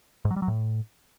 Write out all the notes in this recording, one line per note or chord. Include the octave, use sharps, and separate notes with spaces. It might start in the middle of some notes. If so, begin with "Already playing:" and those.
G#2
F#3
G3
F#3
A2